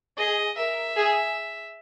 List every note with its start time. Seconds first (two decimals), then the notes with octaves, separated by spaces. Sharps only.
0.17 G#4 D#5
0.57 A#4 E5
0.96 G#4